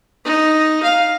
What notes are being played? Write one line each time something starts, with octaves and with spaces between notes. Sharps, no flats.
D#4
F5